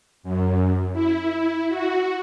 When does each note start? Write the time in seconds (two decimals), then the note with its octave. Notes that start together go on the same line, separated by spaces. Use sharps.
0.23 F#2
0.93 E4
1.69 F#4